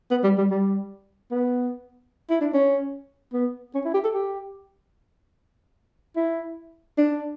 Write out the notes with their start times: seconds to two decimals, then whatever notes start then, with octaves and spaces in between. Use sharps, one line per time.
0.11 B3
0.24 G3
0.38 G3
0.51 G3
1.32 B3
2.30 E4
2.41 D4
2.54 C#4
3.34 B3
3.75 C#4
3.86 E4
3.94 G4
4.05 A4
4.15 G4
6.17 E4
6.98 D4